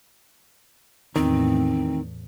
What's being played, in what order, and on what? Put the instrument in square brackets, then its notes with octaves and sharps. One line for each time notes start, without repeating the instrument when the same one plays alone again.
[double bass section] E2 A2 [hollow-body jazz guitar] D#3 [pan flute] C4